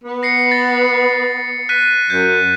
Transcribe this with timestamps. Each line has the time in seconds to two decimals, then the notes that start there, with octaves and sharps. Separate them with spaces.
0.04 B3
0.23 A#6 C7 C#7
0.51 A6 A#6
1.69 F#6 B6 D#7
2.10 F#2 G6